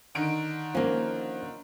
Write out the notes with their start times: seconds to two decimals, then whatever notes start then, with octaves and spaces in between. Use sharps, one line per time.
0.15 D3 D#3 D7
0.75 F3 A#3 C#4